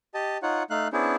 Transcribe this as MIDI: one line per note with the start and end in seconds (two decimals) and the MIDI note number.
0.14 0.38 67
0.14 0.38 75
0.14 0.38 81
0.43 0.63 63
0.43 0.63 65
0.43 0.63 73
0.43 0.63 78
0.70 0.88 57
0.70 0.88 63
0.70 0.88 77
0.70 0.88 90
0.93 1.16 59
0.93 1.16 61
0.93 1.16 62
0.93 1.16 64
0.93 1.16 68
0.93 1.16 72